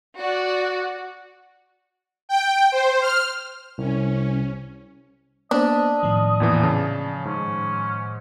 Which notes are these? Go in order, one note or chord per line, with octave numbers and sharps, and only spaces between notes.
F#4 D5
G5
C5
F6
C2 C#4
A#3 B3 D4 C5 D#5
A2 D#3 F3
E2 A#2 E3
C#3 A5
G#2 C#4